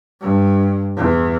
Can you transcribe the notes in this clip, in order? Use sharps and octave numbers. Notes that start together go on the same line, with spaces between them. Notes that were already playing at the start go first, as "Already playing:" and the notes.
G2
E2